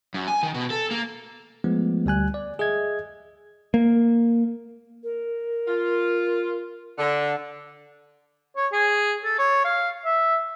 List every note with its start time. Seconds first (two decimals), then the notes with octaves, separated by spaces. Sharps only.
0.14 F#2
0.28 G#5
0.43 D#3
0.54 B2
0.70 A4
0.91 A#3
1.64 F3 G#3 A3 B3
2.06 D2 G3 G#5 F#6
2.34 D5
2.59 G#4 D#5 E5 G#6
3.74 A#3
5.03 A#4
5.67 F4
6.98 D3
8.57 C#5
8.72 G#4
9.24 A4
9.39 C#5
9.65 F5
10.05 E5